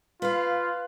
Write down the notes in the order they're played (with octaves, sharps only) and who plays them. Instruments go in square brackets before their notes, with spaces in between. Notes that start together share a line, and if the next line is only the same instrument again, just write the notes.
[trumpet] F4 [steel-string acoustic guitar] B4 F5